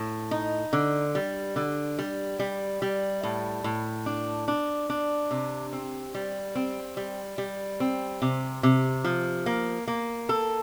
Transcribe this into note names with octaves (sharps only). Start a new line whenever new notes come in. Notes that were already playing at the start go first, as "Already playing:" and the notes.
Already playing: A2
D#4
D3
G3
D3
G3
G3
G3
A2
A2
D4
D4
D4
C3
C4
G3
C4
G3
G3
C4
C3
C3
F3
A#3
A#3
A4